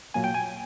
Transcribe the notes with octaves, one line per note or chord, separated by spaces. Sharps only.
A#2 F#3 A#3 G#5
G5
G#5